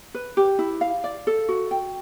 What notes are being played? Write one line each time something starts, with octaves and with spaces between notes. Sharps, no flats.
B4
G4
E4
F5
D5
A4
F#4
G5